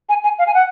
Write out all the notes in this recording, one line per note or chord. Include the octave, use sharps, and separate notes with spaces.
G#5
G#5
F5
G#5
F#5